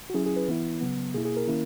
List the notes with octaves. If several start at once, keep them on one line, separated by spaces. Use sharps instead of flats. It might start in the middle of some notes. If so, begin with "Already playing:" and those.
F#4
F#3 C#4 E4 G#4
G#4
B4
E3 B3 E4
C#3 F#3 B3
B2 A#3 E4 G#4
G#4
A#4
D#3 A#3 C#4 E4